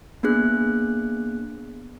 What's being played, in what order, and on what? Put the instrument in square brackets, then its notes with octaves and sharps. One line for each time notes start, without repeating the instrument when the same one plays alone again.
[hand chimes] A#3 B3 D4 G#4 F#6